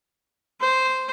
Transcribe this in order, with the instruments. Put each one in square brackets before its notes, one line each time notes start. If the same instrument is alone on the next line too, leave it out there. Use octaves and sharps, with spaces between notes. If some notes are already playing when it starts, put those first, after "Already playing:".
[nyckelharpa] C5